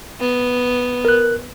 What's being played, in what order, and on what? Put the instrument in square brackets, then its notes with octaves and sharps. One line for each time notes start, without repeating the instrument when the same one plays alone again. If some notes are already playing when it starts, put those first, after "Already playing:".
[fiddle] B3
[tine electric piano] A#4 F#6